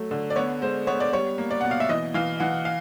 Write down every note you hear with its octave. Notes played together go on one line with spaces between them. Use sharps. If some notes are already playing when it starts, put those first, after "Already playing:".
Already playing: F#3 A3
D3
D5
B3 C#5
G#3 C5
B3 C#5
D5
G3 C#5
A#3
D5
B2 F#5
F5
E5
E3 D#5
E3 F5
E3 F#5
F5